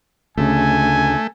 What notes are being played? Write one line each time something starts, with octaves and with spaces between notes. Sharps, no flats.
D2 C#3 A3 G#5